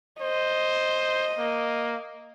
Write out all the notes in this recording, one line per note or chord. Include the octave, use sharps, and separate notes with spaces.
C5 D#5
A#3